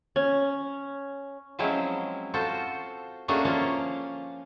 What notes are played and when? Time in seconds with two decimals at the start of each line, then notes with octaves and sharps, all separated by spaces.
0.16 C#4
1.59 F3 F#3 G#3 C4 C#4 E4
2.34 F4 F#4 A4 C5
3.28 A3 A#3 C#4 D4 F#4 G#4
3.45 F3 A#3 C#4 F4